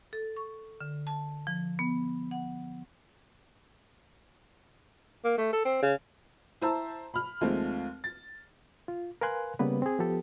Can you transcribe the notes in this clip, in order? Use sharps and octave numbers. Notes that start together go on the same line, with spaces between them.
A4
C#6
D3
A5
F3
B3
F#5
A#3
A3
A4
C4
C#3
E4 C5 A5 A#5 E6
B5 F6
D#2 F3 G#3 A3 C4
A6
F4
A#4 B4 F5 G#5 C6 F#6
C#3 G3 A#3 B3 B4
C4 G#4
F3 B3 G4 A4